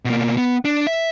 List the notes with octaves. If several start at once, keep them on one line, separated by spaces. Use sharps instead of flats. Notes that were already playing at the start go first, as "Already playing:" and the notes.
B2 A#3
B3
D4
E5